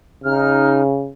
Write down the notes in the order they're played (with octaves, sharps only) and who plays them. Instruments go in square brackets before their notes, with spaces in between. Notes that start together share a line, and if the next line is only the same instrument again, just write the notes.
[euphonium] C#3 [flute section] D#4 F6